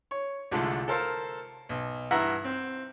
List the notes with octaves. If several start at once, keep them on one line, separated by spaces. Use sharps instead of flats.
C#5
C2 D3 F3 G#3 A3
A4 A#4 C5 F5 A5
B1
G2 E3 E5 F#5 A#5
C4